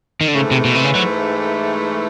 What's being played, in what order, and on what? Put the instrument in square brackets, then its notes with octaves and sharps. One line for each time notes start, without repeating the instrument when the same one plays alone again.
[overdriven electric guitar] D#3
D3
[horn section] G#2 E3 A3 [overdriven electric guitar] C#3
[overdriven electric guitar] C3
B2
C3
C#3
F#3